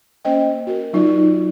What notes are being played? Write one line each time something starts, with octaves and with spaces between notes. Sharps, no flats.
A#3 C#4 C5 D#5 G5
F#4 A#4
F#3 D#4 F4 D5